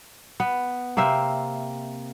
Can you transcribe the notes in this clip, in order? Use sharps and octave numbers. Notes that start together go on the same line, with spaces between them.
B3
C3 A#3 C4 E5